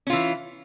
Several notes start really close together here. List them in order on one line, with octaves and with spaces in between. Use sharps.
C#4 F4 E3